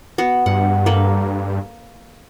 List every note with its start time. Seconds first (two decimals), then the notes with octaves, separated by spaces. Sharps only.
0.18 B3 F#4
0.46 G2 F#5
0.86 A#3 A4 B4